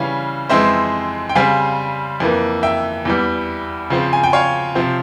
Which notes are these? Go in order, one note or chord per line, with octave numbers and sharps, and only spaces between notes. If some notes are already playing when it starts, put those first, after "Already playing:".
Already playing: C#3 E3 G3 C#4 F5
F2 E3 G#3 C4 C5 E5
G5
C#3 G3 C4 F5 G#5
F2 E3 A#3
E5 G5
E2 E3 G3
C#3 F3 C4
G#5
G5
C#5 F5
C3 F3 C4